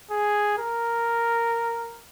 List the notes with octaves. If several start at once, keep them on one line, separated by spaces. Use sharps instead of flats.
G#4
A#4